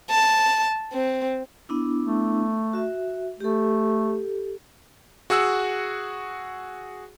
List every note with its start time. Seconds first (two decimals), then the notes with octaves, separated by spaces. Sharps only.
0.10 A5
0.93 C4
1.69 B3 D4 E4
2.04 A3
2.73 F#4 E5
3.40 A3 G4 A4
5.30 F#4 G#4 F#5 E6